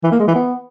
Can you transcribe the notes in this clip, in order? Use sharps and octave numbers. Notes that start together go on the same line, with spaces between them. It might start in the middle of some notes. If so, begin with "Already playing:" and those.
E3
A#3
G#3
E3
B3